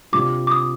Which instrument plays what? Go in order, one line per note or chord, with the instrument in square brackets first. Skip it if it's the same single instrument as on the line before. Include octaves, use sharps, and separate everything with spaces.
[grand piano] C3 G3 D4 F4 [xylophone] D6
[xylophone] D6
D#6